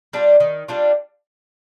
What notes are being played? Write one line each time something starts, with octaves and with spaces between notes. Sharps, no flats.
G3 D4 F4
D#3
G3 D4 F4